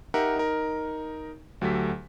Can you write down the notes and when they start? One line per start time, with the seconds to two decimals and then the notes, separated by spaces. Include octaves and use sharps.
0.14 D#4 G4 A#4 E5 F#5
0.36 D#4 A#4
1.61 D2 F#3 G4 A4 B6